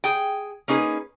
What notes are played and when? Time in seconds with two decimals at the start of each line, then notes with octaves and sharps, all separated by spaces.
0.04 G#4 G5
0.68 A#3 C#4 D#4 G#4 B4